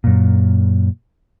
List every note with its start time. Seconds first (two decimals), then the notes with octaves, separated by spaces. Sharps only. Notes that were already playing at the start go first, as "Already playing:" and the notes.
0.04 F#2 A#2